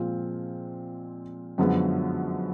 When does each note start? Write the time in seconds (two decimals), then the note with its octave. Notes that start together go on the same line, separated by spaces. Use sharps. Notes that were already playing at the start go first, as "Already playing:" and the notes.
Already playing: A#2 F3 G#3 C4 F4
1.58 F#2 D3 F3 G#3 B3